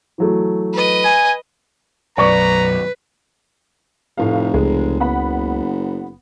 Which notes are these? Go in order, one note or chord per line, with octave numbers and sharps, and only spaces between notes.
E3 F#3 A3
B4 D#5
G#5
B1 F#2 B4 D5 A#5 C#6
F1 A2 F5
C#2 G#3
F#1 B3 F#5 B5